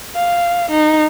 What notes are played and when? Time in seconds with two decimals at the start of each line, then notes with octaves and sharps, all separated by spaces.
0.15 F5
0.71 D#4